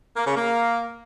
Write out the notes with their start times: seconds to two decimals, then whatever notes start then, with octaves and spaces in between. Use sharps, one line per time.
0.16 A#3
0.26 C#3
0.36 A#3